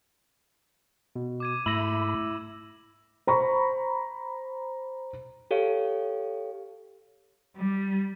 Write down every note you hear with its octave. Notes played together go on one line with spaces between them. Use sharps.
B2
D6 G#6 D#7
G#2 A3 E4 B5 E6 A#6 E7
C5 A#5 B5 C#6
G4 A4 C#5 F5
G3